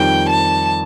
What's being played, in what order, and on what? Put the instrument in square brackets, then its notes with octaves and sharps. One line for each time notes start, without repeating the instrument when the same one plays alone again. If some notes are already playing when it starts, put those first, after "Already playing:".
Already playing: [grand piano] F2 D#3 G3 [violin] G5
[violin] A5